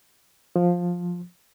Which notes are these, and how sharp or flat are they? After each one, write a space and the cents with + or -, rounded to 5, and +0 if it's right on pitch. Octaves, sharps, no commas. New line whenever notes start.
F3 +10